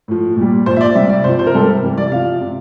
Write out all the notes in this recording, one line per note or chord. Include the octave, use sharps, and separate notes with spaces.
A2 F3
A#2 G3
A#2 F3 C5
E5
D5
C3 G3 E5
D5
C3 F3 C5
C5
A#4
C3 G3 A4
A#4
C3 E3 G3
D5
C3 F3 F5
C3